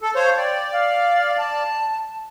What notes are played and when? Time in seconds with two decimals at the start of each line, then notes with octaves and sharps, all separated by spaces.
0.01 A4
0.15 C5 C#5 F5
0.37 D5 G5
0.72 F5
1.38 A5